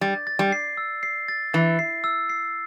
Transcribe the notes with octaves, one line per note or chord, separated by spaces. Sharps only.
G3 A6
A6
G3
C7
E6
C7
A6
E3 A6
C7
E6
C7